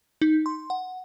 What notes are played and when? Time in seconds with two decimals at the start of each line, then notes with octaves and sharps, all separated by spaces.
0.22 D#4
0.46 C6
0.70 F#5